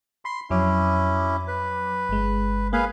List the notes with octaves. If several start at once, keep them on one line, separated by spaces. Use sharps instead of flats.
B5 C6
F2 F#3 C#4 E4 D6
B4
G1 G#3
A#3 G#4 B4 F5